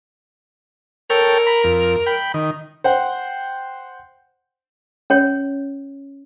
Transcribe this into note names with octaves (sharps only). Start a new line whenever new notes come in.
A4 A#4 C#5 G5
A#5 B5
F2
G5 B5
D#3
C5 F#5 G5
C#4 C#5